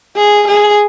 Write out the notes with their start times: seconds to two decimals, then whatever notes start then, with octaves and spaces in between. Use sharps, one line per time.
0.16 G#4
0.48 G#4